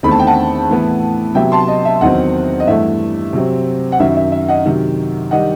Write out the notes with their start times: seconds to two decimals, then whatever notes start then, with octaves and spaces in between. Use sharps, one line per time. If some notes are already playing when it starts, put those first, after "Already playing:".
0.03 E2 D#3 A3 C4 B5
0.11 A5
0.19 G5
0.27 F#5 A5
0.70 A2 E3 B3
1.35 C3 F#3 B3 E5 G5
1.52 A5 C6
1.68 D#5
1.85 E5
2.01 E2 D#3 F#3 C4 D#5 F#5
2.60 D#5
2.67 G2 E3 A3 E5
3.33 C3 F#3 C4
3.92 F#5
4.00 F#2 D#3 F#3 E5
4.17 E5
4.32 E5
4.49 D#5 F#5
4.65 C3 D#3 F#3
5.31 D#3 G3 D#5 F#5